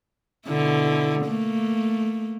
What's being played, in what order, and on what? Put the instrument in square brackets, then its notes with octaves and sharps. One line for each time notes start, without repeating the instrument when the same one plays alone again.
[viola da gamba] B2 D3 E4
A3 A#3